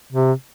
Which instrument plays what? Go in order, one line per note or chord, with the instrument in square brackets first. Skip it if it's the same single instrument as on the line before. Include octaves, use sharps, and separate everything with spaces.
[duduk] C3